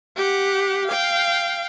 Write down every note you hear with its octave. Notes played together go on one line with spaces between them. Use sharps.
G4 F#5
F5 G5